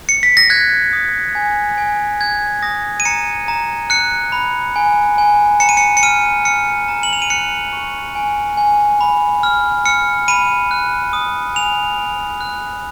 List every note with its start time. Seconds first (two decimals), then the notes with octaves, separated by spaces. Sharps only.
0.09 C#7
0.23 B6
0.37 A#6
0.50 F#6 G#6
0.93 D#6
1.35 G#5
1.78 G#5
2.20 F#6 G#6
2.62 D#6 A#6
3.00 D#7
3.05 A#5 C#7
3.48 A#5
3.90 F#6 C#7
4.32 B5
4.76 G#5
5.18 G#5
5.60 A#5 C#7
5.69 D#7
5.77 C#7
5.97 C#7
6.03 F6 D#7
6.45 F6 C#7
6.88 A#5
7.03 F#7
7.13 F7
7.22 D#7
7.30 F#6 C#7
7.73 C#6
8.15 G#5
8.57 G#5
9.01 B5
9.43 F6
9.85 F6 C#7
10.28 B5 D#7
10.71 F#6
11.13 D#6
11.55 G#5 F7
11.98 G#5
12.41 F#6